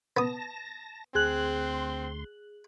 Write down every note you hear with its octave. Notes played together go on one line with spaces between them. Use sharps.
B3 A5 D#6 A#6
D2 C4 G#4 C6 F#6 F#7